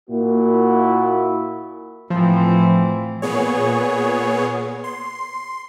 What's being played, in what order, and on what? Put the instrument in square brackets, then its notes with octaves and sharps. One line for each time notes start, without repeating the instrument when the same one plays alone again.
[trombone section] A#2 A#3 E4 F#4
[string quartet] A2 E3 C4 [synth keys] F3
[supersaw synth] A#2 B3 G#4 C#5
C6